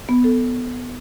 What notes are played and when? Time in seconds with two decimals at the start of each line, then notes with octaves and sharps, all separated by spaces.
0.09 B3
0.24 A4